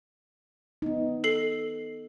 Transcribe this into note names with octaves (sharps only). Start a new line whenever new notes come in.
B3 D#4
A4 C7 F#7